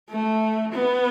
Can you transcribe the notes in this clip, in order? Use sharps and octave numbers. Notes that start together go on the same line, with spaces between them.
A3
B3